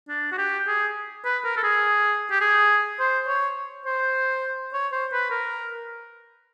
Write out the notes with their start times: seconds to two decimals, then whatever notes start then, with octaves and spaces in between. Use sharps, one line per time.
0.09 D4
0.32 F#4
0.38 G4
0.67 G#4
1.25 B4
1.44 A#4
1.57 A4
1.63 G#4
2.31 G4
2.41 G#4
2.99 C5
3.28 C#5
3.86 C5
4.74 C#5
4.92 C5
5.13 B4
5.31 A#4